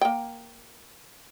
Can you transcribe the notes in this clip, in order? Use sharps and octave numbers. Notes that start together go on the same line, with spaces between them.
A#3 G5